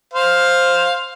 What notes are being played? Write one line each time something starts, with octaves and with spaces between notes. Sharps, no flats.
C5 F5